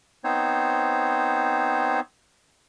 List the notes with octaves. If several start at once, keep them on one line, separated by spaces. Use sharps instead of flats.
B3 C4 D#4 C5 C#5